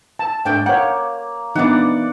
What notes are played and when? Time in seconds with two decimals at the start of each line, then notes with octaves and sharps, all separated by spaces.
0.19 A5
0.45 G#2 A3 D4 G5
0.66 A#3 C#5 F#5 G5
1.55 E3 B3 D4 D#4 D5 F#5